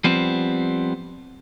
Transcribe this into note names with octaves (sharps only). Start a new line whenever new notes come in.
F3 G3 B3 C4